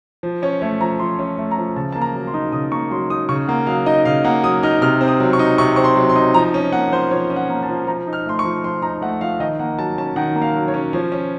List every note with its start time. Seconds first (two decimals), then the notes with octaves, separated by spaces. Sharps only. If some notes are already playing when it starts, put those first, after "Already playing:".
0.23 F3
0.42 C#4 C#5
0.62 A3 C#5
0.81 F3 A#5
0.99 F3 C6
1.19 C#4
1.38 A3
1.51 A#5
1.58 F3
1.76 C#3 A5
1.92 A#3 A5
2.02 A#5
2.15 F#3
2.27 C6
2.34 D#4
2.52 C#3 D#6
2.71 A#3 C#6
2.91 F#3 C6
3.10 D#4 D#6
3.29 C#3 C#6
3.48 A#3 F#5
3.67 F#3 F5
3.86 D#4 D#5
4.05 C#3 F5
4.24 A#3 F#5
4.43 F#3 D#6
4.63 D#4 F6
4.81 C3 F6
5.01 C4
5.08 D#6
5.20 F#3
5.33 C#6
5.39 D#4
5.58 C3 C#6
5.76 C4 C#6
5.84 C6
5.96 F#3
6.09 C6
6.16 D#4
6.34 F3 A#5
6.54 C#4
6.72 A#3 F#5
6.92 F3 C5
7.11 F3 C#5
7.30 C#4
7.36 F#5
7.50 A#3
7.63 A5
7.69 F3
7.87 F3 A#5
8.07 D#4
8.13 F6
8.26 A3 C6
8.39 C#6
8.44 F3
8.64 F3 C6
8.82 D#4 A#5
9.02 A3 F#5
9.21 F3 F5
9.40 D#3 D#5
9.59 A#3 F#5
9.79 F#3 A5
9.98 C#4 A5
10.16 D#3 F#5
10.36 A#3
10.42 F5
10.54 F#3
10.68 C#5
10.74 C#4
10.93 F3 C#5
11.12 C#4